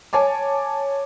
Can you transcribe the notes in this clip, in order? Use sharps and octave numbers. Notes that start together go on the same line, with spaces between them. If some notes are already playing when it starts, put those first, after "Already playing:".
C#5 G#5 A5 D6